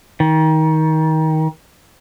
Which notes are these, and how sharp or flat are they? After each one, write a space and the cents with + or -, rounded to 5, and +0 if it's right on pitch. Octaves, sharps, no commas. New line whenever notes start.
D#3 +25